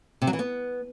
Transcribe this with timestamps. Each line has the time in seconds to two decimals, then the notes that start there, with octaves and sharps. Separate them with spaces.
0.22 C3
0.27 F#3
0.33 E3
0.39 B3